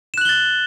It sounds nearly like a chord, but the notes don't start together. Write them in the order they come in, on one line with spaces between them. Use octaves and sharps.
E7 F#6 F#7 G7 A6